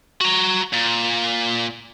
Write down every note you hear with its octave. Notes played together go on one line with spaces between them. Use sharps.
F#4 A#5
A#2